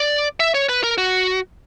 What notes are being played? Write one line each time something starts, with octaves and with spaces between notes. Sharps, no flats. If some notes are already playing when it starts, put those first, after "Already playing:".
Already playing: D5
E5
C#5
B4
A#4
F#4